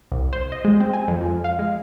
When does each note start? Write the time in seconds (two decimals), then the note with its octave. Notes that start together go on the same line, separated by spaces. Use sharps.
0.12 C2
0.33 C5
0.52 D#5
0.65 G#3
0.80 C4
0.93 G#5
1.08 F2
1.21 F3
1.44 F5
1.59 G#3